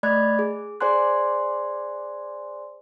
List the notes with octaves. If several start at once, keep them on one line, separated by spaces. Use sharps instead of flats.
A3 D5 D#5 B5 F#6 G#6
G#4
G#4 C5 D5 G#5 C6 F#6